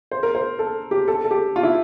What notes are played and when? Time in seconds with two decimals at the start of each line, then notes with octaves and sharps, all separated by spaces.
0.11 C5
0.23 A#4
0.35 C5
0.59 A4
0.91 G4
1.08 A4
1.24 A4
1.31 G4
1.56 F4
1.63 E4